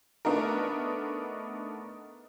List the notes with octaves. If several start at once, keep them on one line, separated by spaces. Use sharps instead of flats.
A3 B3 D4 D#4 A#4